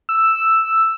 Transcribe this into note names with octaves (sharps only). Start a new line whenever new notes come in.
E6